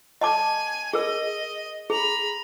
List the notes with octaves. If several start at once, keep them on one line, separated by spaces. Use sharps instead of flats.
D#5 G#5 A5 D6
G#4 A#4 D#5
G#4 A#5 B5